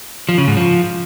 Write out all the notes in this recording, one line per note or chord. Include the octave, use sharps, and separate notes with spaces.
F3
C#3
G#2
F3